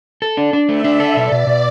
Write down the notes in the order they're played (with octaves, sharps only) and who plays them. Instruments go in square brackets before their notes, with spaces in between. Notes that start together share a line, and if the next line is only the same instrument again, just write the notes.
[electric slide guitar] A4
D4
D4
[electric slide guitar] A3 [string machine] E5
[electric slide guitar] D4
A4
[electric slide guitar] B2 [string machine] D5
[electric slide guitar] B2
B2